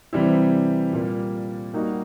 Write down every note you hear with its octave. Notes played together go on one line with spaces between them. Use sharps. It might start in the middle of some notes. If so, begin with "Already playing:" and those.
C3 E3 G3 C4 E4
A#2 G3 A#3
G3 A#3 D#4 F#4